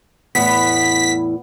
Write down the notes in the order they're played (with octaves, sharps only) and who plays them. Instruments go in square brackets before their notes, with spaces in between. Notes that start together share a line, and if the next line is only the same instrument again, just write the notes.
[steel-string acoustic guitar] E2 A2 [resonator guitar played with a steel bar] B3 [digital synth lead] B6